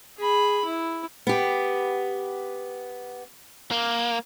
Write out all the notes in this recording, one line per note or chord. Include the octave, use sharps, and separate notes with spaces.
G#4 B5
E4
B3 G4
A#3